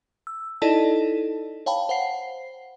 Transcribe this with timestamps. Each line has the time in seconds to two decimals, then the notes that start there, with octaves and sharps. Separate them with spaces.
0.27 E6
0.62 D#4 E4 A4 D5 D#5 A5
1.66 C#5 F5 G5 A5 B5
1.89 C5 F#5 C7